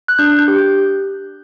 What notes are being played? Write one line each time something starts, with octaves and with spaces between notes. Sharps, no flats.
F#6
D4 G6
G6
G4
G6